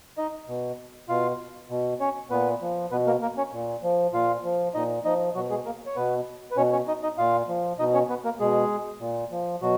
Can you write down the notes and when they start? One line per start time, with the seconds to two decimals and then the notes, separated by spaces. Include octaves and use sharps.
0.18 D#4 D#5
0.48 B2
1.08 B2 F4 F5
1.70 B2
2.00 C#4 C#5
2.30 A#2 B3 B4
2.62 F3
2.91 B2 B3 B4
3.07 A#3 A#4
3.22 A#3 A#4
3.37 C#4 C#5
3.53 A#2
3.83 F3
4.13 A#2 F4 F5
4.44 F3
4.74 A#2 D#4 D#5
5.05 F3 D#4 D#5
5.35 B2 F#3 F#4
5.50 G#3 G#4
5.66 A#3 A#4
5.86 C#5
5.96 B2 B3 B4
6.51 B4
6.57 B2 C#4 C#5
6.73 C#4 C#5
6.87 D#4 D#5
7.03 D#4 D#5
7.18 A#2 F4 F5
7.49 F3
7.79 B2 D#4 D#5
7.94 C#4 C#5
8.09 B3 B4
8.25 A#3 A#4
8.40 B2 G#3 G#4
9.00 A#2
9.32 F3
9.61 B2 F#3 F#4